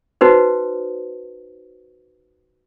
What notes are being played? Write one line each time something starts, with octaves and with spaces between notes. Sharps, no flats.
D#4 F#4 B4 C5